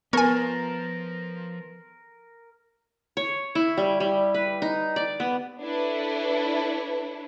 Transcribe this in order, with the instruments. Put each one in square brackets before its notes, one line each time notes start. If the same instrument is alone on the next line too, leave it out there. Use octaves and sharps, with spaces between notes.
[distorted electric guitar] F3 A5 [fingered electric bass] B3 [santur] A#4 [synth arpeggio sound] C#5 G#5
[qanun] C#5
E4
G3
G3
B4
D#4
D5
B3
[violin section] D4 E4 A4 B4 C#5